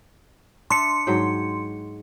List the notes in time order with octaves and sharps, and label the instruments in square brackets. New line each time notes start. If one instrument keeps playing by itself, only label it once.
[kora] D4 E5 [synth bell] C6 C#7
[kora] G#2 F#3 G5